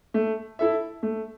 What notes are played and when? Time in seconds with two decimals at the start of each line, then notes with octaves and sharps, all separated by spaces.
0.14 A3
0.59 E4 A4 E5
1.03 A3